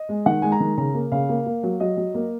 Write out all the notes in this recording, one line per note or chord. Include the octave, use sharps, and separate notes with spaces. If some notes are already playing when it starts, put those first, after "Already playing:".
Already playing: D#5
G#3
D#3 F#5
G#3 G#5
A#5
D#3
C#3 A#5
A#3
C#3 F5
A#3
A#3
F#3
F#3 D#5
F#3
A#3